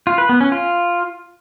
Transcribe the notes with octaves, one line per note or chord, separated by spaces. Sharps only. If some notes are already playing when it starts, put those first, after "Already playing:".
F4
B4
B3
C#4
F4